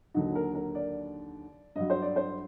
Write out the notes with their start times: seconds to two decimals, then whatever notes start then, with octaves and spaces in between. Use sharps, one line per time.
0.14 D#2 D3 F#3 D#4
0.35 A#4
0.55 A#4
0.75 D5
1.76 G2 F#3 D#5
1.90 C5
2.02 D5
2.16 C5